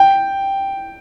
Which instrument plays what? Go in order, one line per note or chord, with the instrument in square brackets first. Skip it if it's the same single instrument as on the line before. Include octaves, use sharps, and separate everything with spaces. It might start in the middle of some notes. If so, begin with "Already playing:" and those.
Already playing: [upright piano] G5